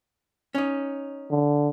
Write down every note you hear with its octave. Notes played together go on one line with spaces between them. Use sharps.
C#4 D#4
D3